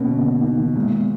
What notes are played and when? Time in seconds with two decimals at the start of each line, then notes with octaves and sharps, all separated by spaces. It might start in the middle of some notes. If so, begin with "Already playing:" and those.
Already playing: B2 A#3 C#4
0.10 D3
0.27 A#3
0.43 D#4
0.60 D#3
0.75 A#2 G#3
0.92 B3